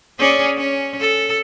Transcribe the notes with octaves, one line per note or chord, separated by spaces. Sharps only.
C#4 G#4 D5
C#4
A4